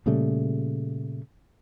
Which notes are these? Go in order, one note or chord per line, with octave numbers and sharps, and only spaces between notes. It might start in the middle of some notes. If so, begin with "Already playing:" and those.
A#2 C#3 G3 A3